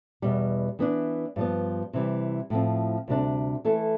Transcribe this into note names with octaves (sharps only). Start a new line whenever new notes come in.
E2 B2 G3
E3 B3 D4
G2 F3 B3
C3 E3 G3
A2 F3 C4
D2 C3 G3 D4
E3 A3 E4 A4